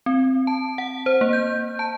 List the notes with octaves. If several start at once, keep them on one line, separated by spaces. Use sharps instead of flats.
C4
A5
F#5
C5
A#3
G6
A5